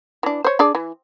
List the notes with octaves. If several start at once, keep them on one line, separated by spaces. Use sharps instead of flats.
E3 D4
C5 C#5
D4 G#4 D5
E3